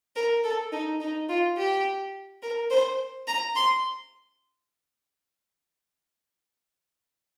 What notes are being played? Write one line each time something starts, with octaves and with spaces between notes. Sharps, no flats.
A#4
A4
D#4
D#4
F4
G4
A#4
C5
A#5
C6